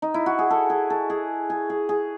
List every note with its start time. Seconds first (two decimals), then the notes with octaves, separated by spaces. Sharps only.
0.02 D#4
0.14 E4
0.26 F#4
0.39 G#4
0.50 A4
0.70 G#4
0.90 A4
1.10 G#4
1.50 G#4
1.70 G#4
1.89 G#4